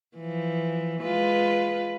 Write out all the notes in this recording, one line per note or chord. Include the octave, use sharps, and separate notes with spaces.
E3 F3
G#3 F4 B4